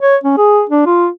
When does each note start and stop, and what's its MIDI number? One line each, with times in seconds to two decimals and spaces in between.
0.01 0.16 73
0.23 0.36 61
0.37 0.64 68
0.69 0.85 62
0.86 1.08 65